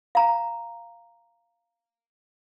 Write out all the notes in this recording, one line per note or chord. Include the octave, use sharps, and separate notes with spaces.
F5 A#5